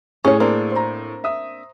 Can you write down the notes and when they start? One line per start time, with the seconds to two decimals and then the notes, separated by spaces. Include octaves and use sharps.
0.25 A2 C#4 G#4 C#5
0.40 A#3 C4 D4
0.72 C5 A#5
1.24 E5 D#6